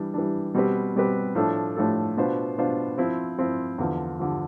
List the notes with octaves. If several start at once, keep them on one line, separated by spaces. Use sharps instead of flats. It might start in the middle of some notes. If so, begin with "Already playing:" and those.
Already playing: E3 G3 D4
E3 G3 D4
B2 G3 C4 G4 B4
B2 G3 C4 G4 B4
A2 F3 A3 D4 A4
A2 F3 A3 D4 A4
B2 B3 D4 F4 C5
B2 B3 D4 F4 C5
F3 C4 E4
F3 C4 E4
E2 D3 F3
D3 F3